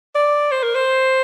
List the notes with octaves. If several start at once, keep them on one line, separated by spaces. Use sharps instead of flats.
D5
C5
A#4
C5